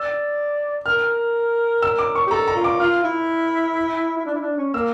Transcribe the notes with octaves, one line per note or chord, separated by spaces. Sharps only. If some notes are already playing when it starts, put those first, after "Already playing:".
Already playing: D5 E6
A#4 F6
E6
D6
C#6
G4
A4 A#5
A#5
F4
D6
F4 F6
E4
E4
D4
E4
D4
C#4
A#3 E6